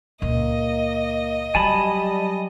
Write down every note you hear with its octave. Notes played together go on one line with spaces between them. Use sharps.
C#2 A#2 A#3 D#5
F#3 G3 G#5 A5 B5